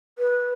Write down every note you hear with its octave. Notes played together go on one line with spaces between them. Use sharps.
B4